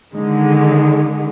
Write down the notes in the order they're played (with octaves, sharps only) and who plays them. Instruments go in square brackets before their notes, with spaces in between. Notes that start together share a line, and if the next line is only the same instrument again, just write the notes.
[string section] D3 D#3 G#3